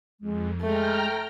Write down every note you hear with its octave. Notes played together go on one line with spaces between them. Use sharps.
F2 G#3
G#3 A3 G5 A#5 F6